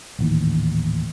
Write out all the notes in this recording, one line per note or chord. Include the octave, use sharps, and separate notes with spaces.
D#1 A1 D#2